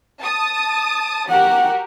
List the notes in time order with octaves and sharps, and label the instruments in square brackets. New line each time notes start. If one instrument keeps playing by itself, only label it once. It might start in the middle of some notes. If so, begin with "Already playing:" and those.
[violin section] A5 D#6
[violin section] F#4 G4 A#4 [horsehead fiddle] F#5